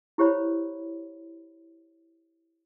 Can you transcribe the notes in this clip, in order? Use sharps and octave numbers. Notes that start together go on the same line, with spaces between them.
E4 G4 C5 C#5 B5